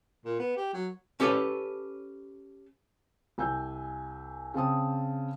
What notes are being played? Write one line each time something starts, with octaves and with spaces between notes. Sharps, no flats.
A#2
B3
G4
F#3
C#4 G4 A4 B4 C#5
C2 G#5 E6 G6
C#3 C4 A5 D#6